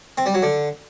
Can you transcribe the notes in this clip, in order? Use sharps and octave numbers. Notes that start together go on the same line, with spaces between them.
C4
G3
F#3
D3